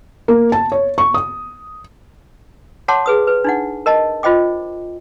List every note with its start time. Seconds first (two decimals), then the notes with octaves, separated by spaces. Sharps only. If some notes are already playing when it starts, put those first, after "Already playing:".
0.28 A#3
0.52 A5
0.72 C#5
0.98 C#6
1.14 D#6
2.88 C#5 F#5 A5 C6 D6
3.06 G#4 B4 D#6
3.27 B4
3.44 D4 D#4 F#5
3.86 A#4 D#5 A5
4.23 F4 C5 D#5 G5 D6